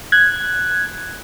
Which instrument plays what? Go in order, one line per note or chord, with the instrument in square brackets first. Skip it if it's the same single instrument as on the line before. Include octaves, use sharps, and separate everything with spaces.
[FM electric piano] F#6 G#6